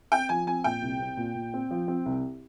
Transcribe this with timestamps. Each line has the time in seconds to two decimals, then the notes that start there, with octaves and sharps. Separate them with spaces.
0.12 C4 G5
0.29 F3 G#5
0.47 C4 G#5
0.64 A#2 G5
0.82 C2
1.00 C4
1.17 A#2
1.35 A#2
1.54 C4
1.71 F3
1.88 C4
2.06 C2